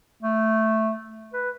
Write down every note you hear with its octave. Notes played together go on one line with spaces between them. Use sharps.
A3
B4